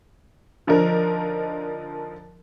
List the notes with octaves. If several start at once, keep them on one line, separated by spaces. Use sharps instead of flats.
D3 F3 D4 D#4 A#4